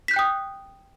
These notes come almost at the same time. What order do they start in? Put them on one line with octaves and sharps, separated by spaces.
B6 G6 F#6 G5 D#6